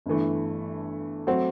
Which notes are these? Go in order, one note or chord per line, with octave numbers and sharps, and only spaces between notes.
G1 G2 E3 A3
F#3 A3 C4 F#4